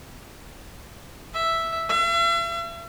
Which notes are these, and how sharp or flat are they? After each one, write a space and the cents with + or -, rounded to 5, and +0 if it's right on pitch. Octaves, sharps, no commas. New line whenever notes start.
E5 +0
E5 +45